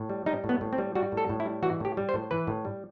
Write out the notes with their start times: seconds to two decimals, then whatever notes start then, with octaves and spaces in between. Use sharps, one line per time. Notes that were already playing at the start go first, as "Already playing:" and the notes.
Already playing: A2
0.09 G3
0.26 G3 D#4
0.44 A2
0.49 B3
0.61 A2
0.73 C4
0.78 G3
0.95 G3 F#4
1.12 A2
1.17 A4
1.29 A2
1.40 E4
1.45 G3
1.63 E3 F#4
1.80 A2 G4
1.97 G3
2.09 C5
2.14 A2
2.31 E3 B4
2.47 A2
2.65 G3